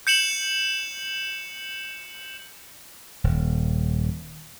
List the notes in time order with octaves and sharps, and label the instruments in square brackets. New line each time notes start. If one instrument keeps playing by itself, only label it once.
[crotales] G6 C#7 E7 F#7
[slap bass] D#1